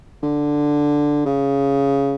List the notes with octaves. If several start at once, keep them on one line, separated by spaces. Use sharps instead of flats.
D3
C#3